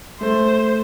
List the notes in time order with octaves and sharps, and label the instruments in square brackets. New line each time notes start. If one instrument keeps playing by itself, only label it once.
[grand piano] A3 [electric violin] C5